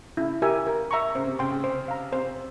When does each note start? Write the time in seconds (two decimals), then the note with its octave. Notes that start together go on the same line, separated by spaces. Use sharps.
0.17 C#3 E4
0.42 G4 A#4 E5 G#5
0.67 A#4
0.91 E5 A#5 C#6
1.15 C#3 C5
1.27 C3
1.39 C#3 G5 C6
1.52 C#3
1.64 C5
1.88 F5 A#5
2.12 C3 C5